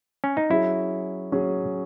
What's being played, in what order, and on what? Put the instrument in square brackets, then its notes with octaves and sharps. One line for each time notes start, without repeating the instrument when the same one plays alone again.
[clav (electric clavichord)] C#4
D#4
[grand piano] F#3 C#4 G#4 [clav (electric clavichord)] E4
[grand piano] F#3 C#4 G#4